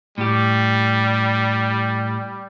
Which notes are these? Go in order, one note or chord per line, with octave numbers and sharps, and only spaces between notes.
A2 G3 G4